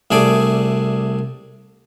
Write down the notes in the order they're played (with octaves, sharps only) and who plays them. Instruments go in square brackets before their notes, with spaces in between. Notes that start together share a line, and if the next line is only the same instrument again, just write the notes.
[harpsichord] C2 A3 G#4 D5